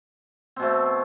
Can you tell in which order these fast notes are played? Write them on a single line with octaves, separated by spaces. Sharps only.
C4 B2 A3